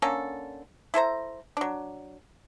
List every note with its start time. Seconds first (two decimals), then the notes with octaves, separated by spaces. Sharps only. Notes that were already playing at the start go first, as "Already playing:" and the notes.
0.02 D3 A#3 C#4 A4
0.94 E4 A4 C5 A#5
1.57 F#3 D4